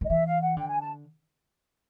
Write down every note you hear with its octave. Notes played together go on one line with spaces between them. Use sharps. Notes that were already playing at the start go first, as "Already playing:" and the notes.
D#3
D#5
E3 E5
F5
F#5
D3 G5
G#5
A5